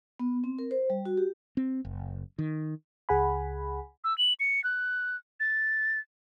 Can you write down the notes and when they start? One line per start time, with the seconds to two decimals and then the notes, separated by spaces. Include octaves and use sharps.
0.20 B3
0.44 C4
0.59 A#4
0.71 C5
0.90 G3
1.05 F#4
1.17 G4
1.57 C4
1.85 F#1
2.39 D#3
3.09 C#2 G#4 F#5 G#5 B5
4.04 E6
4.18 F#7
4.40 C#7
4.64 F#6
5.40 A6